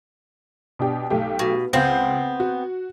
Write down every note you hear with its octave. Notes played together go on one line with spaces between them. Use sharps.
B2 D4 G4
B1 A3 G4
B2
C#2 B3 C4 F5 G5
F#4